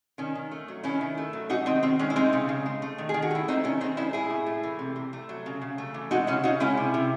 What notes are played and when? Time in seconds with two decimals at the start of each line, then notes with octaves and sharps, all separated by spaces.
0.18 D#3 C#4
0.35 D#3
0.51 A3
0.68 F#3
0.84 D#3 C#4 E4
1.01 D#3
1.18 A3
1.33 F#3
1.49 G#3 D#4 F#4
1.66 D#3 C4 D#4
1.83 D#3 C4
1.99 G#3 C#4
2.10 E4
2.16 G#3 C4 D#4
2.33 C#3
2.49 C#3
2.66 G#3
2.82 A3
2.98 D#3
3.09 G#4
3.14 D#3
3.22 F#4
3.31 A3 E4
3.48 G#3 C4 D#4
3.64 D#3 C#4
3.81 D#3 C4 D#4
3.97 G#3 C#4 E4
4.13 A2 E4 G#4
4.30 A2
4.46 A3
4.63 E3
4.79 C3
4.96 C3
5.13 A3
5.29 F#3
5.46 C#3
5.62 C#3
5.78 A3
5.94 E3
6.11 G#3 D#4 F#4
6.27 C#3 C#4 E4
6.44 C#3 D#4 F#4
6.60 G#3 C#4 E4
6.77 C3
6.94 C3